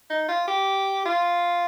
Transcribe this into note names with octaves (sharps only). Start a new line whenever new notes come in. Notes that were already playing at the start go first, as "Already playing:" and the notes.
D#4
F4
G4
F4